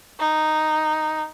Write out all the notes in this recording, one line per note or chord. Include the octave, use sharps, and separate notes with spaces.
D#4